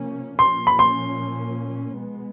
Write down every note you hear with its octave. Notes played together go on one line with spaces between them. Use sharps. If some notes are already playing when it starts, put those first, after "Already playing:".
Already playing: C3 F3 A#3 C#4
A#2 F3 A#3 C#4 C6
B5
C6
B2 G#3 B3